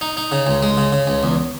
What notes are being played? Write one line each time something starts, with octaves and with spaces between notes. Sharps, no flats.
D#4
D#4
C#3
C#2
G#3
C#3
C#3
C#2
E2